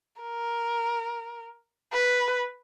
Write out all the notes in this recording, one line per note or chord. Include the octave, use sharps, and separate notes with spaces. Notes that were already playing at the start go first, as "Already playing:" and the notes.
A#4
B4